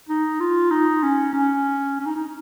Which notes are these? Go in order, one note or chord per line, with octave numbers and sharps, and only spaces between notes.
D#4
F4
D#4
C#4
C#4
C#4
D#4
D#4